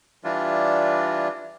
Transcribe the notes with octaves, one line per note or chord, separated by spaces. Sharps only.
E3 G3 D4 E4 F4